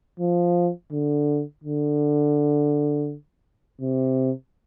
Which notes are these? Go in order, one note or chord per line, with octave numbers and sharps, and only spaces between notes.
F3
D3
D3
C3